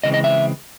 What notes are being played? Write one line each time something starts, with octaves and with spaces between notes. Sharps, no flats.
C#3 E3 G#3 C4 D#5
D#5
E5